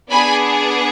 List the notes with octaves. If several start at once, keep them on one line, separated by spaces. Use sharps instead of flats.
B3 D4 G#4 G#5 B5